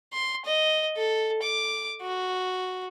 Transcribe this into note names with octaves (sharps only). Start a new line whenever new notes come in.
C6
D#5
A4
D6
F#4